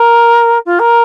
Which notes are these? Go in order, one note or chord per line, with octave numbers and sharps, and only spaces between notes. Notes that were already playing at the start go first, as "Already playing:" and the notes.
Already playing: A#4
F4
A#4